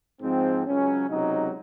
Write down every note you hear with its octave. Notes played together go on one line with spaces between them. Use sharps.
G#2 F3 C4
C#2 C#3 F#3 C#4
C#2 C3 F#3 D#4